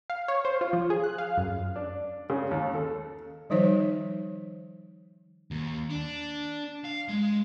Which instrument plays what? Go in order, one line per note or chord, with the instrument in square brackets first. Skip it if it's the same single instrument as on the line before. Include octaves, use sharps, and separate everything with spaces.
[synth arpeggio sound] F5
C#5
C5
F4
F3
G#4
F#6
F5
F#2
[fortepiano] D4
C#3
D#2
A4
[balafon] D#3 F3 G3 D#4 C5 C#5
[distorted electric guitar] D#2
D4
F5
G#3